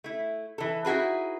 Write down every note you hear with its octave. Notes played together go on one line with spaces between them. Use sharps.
A3 E4
E3 A4
D#4 E4 F#4 G#4 B4